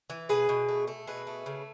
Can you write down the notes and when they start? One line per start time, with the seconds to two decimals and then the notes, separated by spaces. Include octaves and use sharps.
0.10 E3
0.29 B2 G#4 B4
0.49 B2
0.68 A3
0.87 A3
1.07 B2 G#4 B4
1.27 A3
1.46 C#3